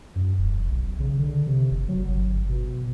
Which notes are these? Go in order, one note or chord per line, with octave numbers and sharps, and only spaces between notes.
F#2
E1
B1
C#3
D3
C3
F#1
F#3
G1
B2